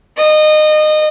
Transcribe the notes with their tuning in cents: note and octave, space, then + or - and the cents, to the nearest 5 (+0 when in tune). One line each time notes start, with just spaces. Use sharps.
D#5 -25